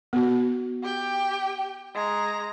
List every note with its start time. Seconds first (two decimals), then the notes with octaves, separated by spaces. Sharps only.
0.13 B3 F#4
0.83 G4 G5
1.95 G#3 A#5